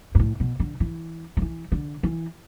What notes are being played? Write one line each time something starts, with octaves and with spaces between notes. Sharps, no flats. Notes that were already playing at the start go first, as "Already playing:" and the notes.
G2
A2
B2
D3
E3
F3
E3
D3
E3